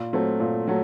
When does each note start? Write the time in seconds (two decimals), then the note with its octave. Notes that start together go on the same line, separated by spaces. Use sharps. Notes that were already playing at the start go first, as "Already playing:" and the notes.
Already playing: A#2
0.13 F#3 A3 C4
0.40 A#2
0.67 F#3 A3